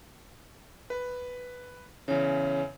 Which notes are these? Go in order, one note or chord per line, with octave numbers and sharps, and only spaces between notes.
B4
E2 C#3 C#5